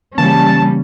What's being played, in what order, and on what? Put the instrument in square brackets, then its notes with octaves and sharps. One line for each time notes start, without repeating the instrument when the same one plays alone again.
[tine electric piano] C#3 E3 A#3 [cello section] G3 C#4 [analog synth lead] A5